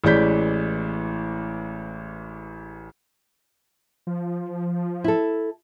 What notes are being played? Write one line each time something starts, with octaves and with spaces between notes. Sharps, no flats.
A1 E3 G#3 D5 G6 B6
F3
E4 A4